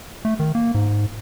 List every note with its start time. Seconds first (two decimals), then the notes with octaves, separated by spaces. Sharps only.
0.25 A3
0.39 D#3
0.55 A#3
0.74 G#2